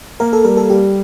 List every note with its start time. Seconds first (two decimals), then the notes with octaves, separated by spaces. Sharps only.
0.20 A#3 A#4
0.33 A4
0.44 G3 A#4
0.57 A4
0.70 G3 G4